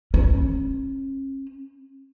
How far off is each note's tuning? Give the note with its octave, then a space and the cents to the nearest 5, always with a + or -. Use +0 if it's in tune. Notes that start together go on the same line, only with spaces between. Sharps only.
C#4 -40